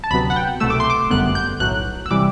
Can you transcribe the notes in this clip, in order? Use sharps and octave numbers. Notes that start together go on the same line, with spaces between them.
A5
D2 C3 F#3 B3 B5
F#5
G5
C2 B2 A3 E6
D6
C6
D6
G1 F#2 D3 G3 B3 F#6
G6
B1 A2 F#3 F#6
E6
C3 E3 G3 D6